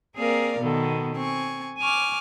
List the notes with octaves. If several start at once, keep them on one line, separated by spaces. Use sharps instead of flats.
A#3 C4 G#4 A#4 D5 F5
B2 D#3 B3 A4
C4 G#5 C#6
G#5 C#6 D6 F6